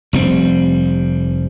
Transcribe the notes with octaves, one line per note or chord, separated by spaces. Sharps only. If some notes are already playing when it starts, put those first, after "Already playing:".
F1 G3 C4